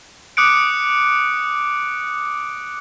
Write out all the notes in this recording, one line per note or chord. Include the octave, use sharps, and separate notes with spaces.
D6 D#6 F#6 C#7 D7